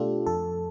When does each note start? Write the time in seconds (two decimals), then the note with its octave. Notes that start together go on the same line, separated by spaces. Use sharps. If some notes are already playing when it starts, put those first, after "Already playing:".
Already playing: B2 A3 D4 F4 G4 A4
0.27 F2 A4